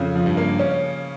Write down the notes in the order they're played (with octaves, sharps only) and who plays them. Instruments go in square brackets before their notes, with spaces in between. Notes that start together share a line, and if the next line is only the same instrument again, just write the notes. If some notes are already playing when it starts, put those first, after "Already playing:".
Already playing: [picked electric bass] F2 [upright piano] C#3
[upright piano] F3
[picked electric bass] G2
[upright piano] A#3
C#4